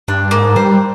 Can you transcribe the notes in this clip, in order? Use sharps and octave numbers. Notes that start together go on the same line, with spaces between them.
G2 D4
G#2 A#3
G3 C5